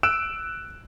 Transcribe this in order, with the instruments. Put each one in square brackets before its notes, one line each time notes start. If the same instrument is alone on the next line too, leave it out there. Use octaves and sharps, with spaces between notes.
[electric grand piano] E6 F#6 D7 E7